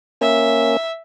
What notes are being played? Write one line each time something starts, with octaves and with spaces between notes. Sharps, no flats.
A#3 C#4 E5